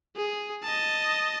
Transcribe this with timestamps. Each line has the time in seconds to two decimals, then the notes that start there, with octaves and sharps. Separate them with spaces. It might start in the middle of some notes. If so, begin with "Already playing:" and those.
0.17 G#4
0.63 D#5 A5